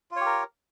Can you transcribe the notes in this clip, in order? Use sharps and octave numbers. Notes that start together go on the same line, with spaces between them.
F4 G4 A#4 C#5